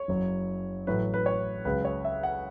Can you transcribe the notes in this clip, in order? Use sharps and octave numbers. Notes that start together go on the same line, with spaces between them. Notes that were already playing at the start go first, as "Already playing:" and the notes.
Already playing: C#5
F#1 F#2 F#3
A1 A2 F#3 B4
B4
C#5
C#2 C#3 F#3 B4
C#5
E5
F#5